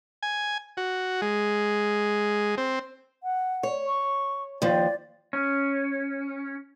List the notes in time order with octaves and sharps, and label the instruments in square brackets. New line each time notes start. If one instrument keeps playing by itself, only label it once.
[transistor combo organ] G#5
F#4
G#3
C4
[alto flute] F#5
[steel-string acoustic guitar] C#5
[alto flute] C#6
[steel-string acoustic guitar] D#2 F3 [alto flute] D5
[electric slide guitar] C#4